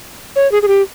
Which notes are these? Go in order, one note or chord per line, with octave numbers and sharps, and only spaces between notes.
C#5
G#4
G#4
G4